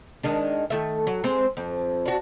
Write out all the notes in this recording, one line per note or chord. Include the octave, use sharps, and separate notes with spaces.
D#3 G#3 D4
D#3 A3 E5
F#3
G#3 C4
F2
D4 F#4